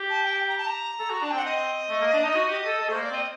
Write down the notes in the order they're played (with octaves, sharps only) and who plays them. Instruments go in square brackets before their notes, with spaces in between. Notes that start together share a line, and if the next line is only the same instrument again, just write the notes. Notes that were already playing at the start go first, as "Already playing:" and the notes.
Already playing: [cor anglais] G4
[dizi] A5
G5
A#5
A5
A#5
[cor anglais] A4
F#4
[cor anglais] D4 [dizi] A5
[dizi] G5
[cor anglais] C4 [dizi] F#5
[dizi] D#5
[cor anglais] A3
A#3
D4
D#4
F#4
G4
A4
A4
[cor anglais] A3 [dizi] C5
[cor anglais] A#3
[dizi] D5
[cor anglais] C4 [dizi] D#5